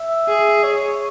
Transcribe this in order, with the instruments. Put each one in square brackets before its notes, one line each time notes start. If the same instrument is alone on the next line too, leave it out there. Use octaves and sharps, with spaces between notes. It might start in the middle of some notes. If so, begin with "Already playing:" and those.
Already playing: [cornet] E5
[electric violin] G#4
[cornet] C#5